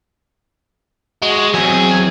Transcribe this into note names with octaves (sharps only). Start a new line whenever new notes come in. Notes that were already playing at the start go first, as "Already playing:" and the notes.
G#3 F#4
E2 F#3 C4 G#4